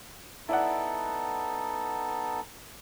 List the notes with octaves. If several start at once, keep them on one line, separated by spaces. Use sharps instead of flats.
B3 D#4 E4 A4 D5 F#5